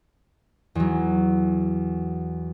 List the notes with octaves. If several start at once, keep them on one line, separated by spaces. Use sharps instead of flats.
E2 F#3